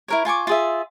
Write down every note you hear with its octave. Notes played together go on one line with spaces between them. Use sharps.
E4 A#4 C#5
F4 G#5 C#6 D6
F4 G#4 E5